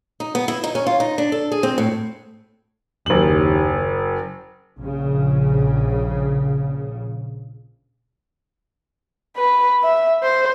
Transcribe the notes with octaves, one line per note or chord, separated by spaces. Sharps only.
D#4
B3
E4
D#4
C#4
F4
D#4
D4
A4
G#4
C4
A2
F#1 D#2 F#7
A#1 C#3
B4
E5
C5